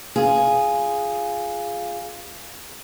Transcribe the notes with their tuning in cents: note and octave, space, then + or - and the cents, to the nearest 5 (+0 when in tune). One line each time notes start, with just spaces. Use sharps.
F4 -5 G#4 +0